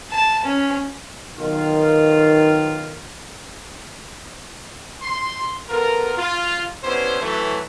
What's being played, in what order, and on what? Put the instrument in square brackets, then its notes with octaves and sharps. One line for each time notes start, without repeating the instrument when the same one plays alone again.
[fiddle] A5
C#4
[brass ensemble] B1 D#3 F4
[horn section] C6
B3 F4 A4 A#4
F4
B3 C#4 D4 E4 G4 C5
E3 F#3 A3